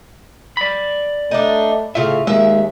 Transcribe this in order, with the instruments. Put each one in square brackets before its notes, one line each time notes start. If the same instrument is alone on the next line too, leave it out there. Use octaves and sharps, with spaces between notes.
[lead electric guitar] D5 B5
[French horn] A3 [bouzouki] D4 D#4
[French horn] A2 [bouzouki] C#3 F4 [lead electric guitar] E5
[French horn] D#2 [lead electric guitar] G#3 [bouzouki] E5